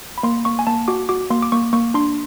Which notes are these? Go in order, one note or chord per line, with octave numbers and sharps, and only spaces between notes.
B5
A#3 C6
A#3 C#6
G#5
A#3 A5
F#4 D6
F#4 D6
A#3 C6
D6
A#3 C#6
A#3 C#6
D4 C6